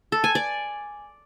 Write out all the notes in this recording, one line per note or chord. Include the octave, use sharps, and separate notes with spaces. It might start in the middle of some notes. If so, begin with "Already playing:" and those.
A4
G#5
D5